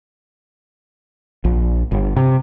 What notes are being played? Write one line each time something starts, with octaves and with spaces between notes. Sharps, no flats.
A#1
G1
C3